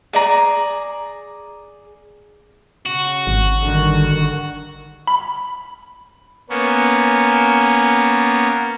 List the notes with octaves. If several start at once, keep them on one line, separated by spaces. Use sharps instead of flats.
G#4 D5 A#5
C#3 F#4
G#1
D3 D#3 G3
B5
A#3 B3 C#4